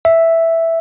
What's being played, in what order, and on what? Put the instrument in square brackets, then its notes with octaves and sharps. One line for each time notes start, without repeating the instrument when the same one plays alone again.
[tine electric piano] E5